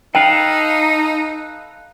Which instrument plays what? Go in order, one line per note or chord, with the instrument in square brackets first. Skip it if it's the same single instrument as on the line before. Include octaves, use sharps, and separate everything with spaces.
[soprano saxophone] D#4 [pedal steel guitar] A4 B4 F5 [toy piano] G5